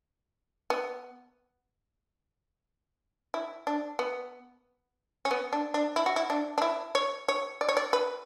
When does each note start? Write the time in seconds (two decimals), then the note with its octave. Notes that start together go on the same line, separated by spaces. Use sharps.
0.70 B3
3.34 E4
3.67 D4
3.99 B3
5.25 C#4
5.31 B3
5.53 D4
5.74 D4
5.96 E4
6.06 F#4
6.16 E4
6.30 D4
6.58 D4
6.62 E4
6.95 C#5
7.28 C#5
7.61 D5
7.69 C#5
7.77 D5
7.93 B4